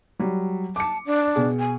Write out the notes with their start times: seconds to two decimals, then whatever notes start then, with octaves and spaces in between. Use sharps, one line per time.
0.19 F#3 G3
0.76 A5 D6 C#7
1.06 D4
1.36 B2 G#4
1.59 G#5